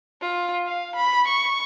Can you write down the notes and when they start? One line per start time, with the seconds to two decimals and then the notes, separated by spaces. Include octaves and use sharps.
0.22 F4
0.66 F5
0.96 B5
1.28 C#6